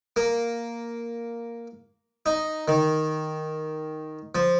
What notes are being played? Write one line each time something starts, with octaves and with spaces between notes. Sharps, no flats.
A#3
D#4
D#3
F3